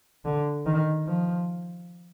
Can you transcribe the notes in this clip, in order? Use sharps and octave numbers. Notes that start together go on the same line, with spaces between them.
D3
D#3
F3